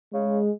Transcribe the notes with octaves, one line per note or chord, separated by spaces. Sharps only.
C#3 G#3